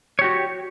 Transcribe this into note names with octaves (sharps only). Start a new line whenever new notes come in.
F#4 G4 C#5